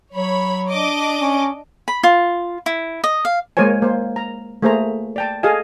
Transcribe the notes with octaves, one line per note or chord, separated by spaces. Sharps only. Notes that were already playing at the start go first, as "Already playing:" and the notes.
F#3 C#5 B5
D4 D#5 D6
C#4
B5
F4
E4
D#5
F5
G#3 A#3 A#4 C5 C#5 G#5
A#3 C5
A#5
A3 A#3 G#4 C5 E5 A#5
D5 G5 A5
G#4 A4 D#5 F5 G#5